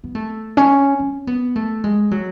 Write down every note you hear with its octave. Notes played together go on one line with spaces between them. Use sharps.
B3
A3
C#4
C#4
B3
A3
G#3
F#3